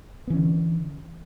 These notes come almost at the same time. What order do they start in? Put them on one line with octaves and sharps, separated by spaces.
B3 E3 C#4 D3